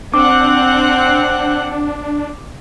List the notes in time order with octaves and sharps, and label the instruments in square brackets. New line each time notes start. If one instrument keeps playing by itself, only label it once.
[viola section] C4 F#5 [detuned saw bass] D4 [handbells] D6